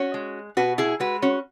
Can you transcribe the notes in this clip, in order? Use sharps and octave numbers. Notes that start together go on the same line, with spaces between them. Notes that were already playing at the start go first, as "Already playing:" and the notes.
Already playing: C#4 F#4
G#3
B2 F#4 B4
E4 G#4
G#3 F#4 B4
C#4 F#4